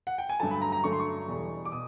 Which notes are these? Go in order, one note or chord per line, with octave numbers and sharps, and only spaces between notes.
F#5
G5
G#5
G2 D3 F#3 A3 A5
B5
A#5
A#5
G2 D3 F#3 A3 C#6
C6
C#6
E2 B2 G3
D6
B2 D#6